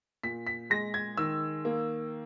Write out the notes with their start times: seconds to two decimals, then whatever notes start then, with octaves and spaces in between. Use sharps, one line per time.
0.23 A#2 B6
0.47 B6
0.70 G#3 A#6
0.94 G#6
1.17 D#3 E6
1.65 A#3